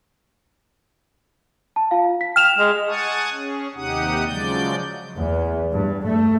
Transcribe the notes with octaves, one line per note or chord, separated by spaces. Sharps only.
A5
F4 F5
B6
G5 F6 E7 F7
G#3
F#5 G#5 A5 C#6 D#6
C#4 G#4
D#2 C3 D#4 G4 F#5 D#6
C#3 F3 F#3 G#3 D5 G6
E2
G2
A3